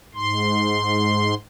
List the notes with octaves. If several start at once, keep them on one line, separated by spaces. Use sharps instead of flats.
G#2 C6